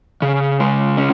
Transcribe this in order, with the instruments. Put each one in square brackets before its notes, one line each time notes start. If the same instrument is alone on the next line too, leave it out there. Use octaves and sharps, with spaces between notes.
[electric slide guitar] C#3
G#3
C#4